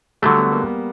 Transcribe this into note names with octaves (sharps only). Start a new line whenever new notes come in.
D3 F#3 G3 A3
B3
A#3
B3